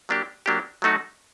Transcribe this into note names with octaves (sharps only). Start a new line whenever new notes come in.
F#3 A#3 D4 G4
F#3 A#3 D4 G4
F#3 A3 D#4 F#4